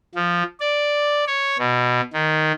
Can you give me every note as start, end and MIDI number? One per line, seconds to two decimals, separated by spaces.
0.15 0.43 53
0.60 1.24 74
1.27 1.57 73
1.59 2.01 47
2.13 2.52 51